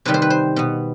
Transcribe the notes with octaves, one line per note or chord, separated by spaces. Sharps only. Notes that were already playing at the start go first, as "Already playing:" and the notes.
C3 D#3 G3 B4
C5
B4
C5
B2 B3